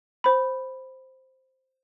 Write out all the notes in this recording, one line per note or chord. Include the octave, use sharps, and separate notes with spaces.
C5 B5